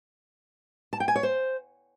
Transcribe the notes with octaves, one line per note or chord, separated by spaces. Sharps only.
A5
G5
G#5
C#5
C5